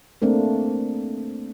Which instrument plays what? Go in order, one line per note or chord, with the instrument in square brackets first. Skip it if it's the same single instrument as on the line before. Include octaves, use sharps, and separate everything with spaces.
[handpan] A3 A#3 C4 D4 A#4